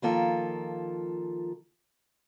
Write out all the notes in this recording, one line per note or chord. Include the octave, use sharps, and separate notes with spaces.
D#3 F3 A#3 F4 A4